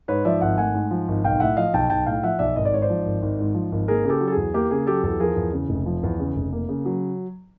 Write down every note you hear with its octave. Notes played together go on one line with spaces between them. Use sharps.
G#2 B4 C#5
F3 D5 E5
G#1 E5 F#5
A3 F#5 G#5
G#2
F3
G#1
B1 F5 G5
A2 E5 F#5
F3 D#5 F5
B1 G5 A5
B1 G5 A5
A2 F5 G5
F3 E5 F#5
B1 D5 E5
G#1 D#5
D5
G#2 C#5
C5 D5
F3
G#1
G#1
G#2
F3
G#1
A#3 G#4 A#4
C#3 G4 G#4 A4
F#3
A4
G#4
E2
A#3 G4
C#3 G#4
F#3 G4 A4
E2 G4 A4
F3 G#4 A#4
E2
C#3
F1
F3
E2
C#3
F1
A#3
C#3
F#3